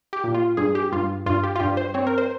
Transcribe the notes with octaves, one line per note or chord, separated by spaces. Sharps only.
G4
A#2
F4
G2 G#4
G4
G2 F4
G2 F4
G4
F4
G2 G4
C5
C4 C#5
A#4
C5